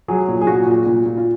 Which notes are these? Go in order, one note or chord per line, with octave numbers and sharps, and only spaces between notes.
F#3 G#4
A#2
G#4
A#2 F#4
A#2
A#2
A#2
F4